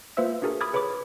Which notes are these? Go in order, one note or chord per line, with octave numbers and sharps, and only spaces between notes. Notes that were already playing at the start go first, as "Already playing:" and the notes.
A#3 F4 B4 C5 E5 E6
D4 F#4 G#4 A#4
B5 D6 D#6 F6 G#6 A6
G#4 B4 C#5 B5 D6